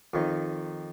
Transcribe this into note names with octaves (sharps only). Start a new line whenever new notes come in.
F2 D#3